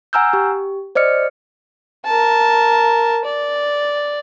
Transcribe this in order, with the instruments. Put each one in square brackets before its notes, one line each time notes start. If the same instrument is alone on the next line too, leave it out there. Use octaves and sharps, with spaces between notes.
[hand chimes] F#5 G#5 A#5 E6 F6 G6
G4
C5 D5 D#5 F6 C#7
[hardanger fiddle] A#4 A5
D5